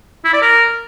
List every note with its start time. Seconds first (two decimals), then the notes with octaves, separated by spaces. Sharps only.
0.25 E4
0.33 D5
0.42 A#4